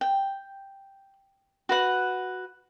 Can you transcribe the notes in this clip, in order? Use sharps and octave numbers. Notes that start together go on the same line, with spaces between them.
G5
F#4 B4 F#5